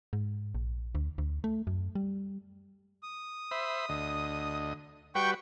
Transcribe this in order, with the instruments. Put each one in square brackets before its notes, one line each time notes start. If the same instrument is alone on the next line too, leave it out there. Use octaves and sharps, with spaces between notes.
[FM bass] G#2
A#1
D2
D2
A3
F#2
G3
[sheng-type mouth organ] D#6
[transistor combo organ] C5 E5 B5
D2 D#5
[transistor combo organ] G3 F#4 B4 [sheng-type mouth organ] G5 C#6 G6